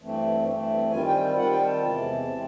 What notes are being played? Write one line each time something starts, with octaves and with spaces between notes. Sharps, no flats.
G2 E3 A3 C4
G2 E3 A3 C4
D#3 G3 C4 F4 G#5
G5
D#3 G3 C4 F4 F#5
G5
A5
E2 C3 E3 G#3 C4
C3 E3 G#3 C4